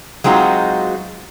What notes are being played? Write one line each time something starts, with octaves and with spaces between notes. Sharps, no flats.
F#3 G#3 C4 D#4 F4 F#4